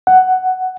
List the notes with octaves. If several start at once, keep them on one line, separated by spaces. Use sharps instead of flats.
F#5